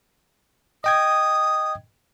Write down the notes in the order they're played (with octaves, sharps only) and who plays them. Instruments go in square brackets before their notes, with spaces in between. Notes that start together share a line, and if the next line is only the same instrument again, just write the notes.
[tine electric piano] D#5 G5 G#6 [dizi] D#6